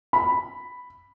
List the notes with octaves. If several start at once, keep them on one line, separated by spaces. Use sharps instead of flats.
B5